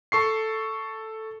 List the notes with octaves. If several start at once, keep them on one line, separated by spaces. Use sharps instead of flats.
A4 C#6 C7